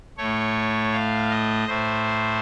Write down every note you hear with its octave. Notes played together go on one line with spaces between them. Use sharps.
A2 A3 C#5
F5
D#5
A2 A3 C5